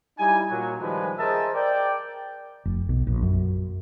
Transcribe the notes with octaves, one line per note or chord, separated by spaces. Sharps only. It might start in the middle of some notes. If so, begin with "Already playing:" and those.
G3 D#4 E4 G#5
A#2 F#3
D#3 F3 G3 G#3 B4 G#5
G#4 A#4 C5 D#5 E5 A5
A#4 D5 G5
F1
B1
A#1
F#2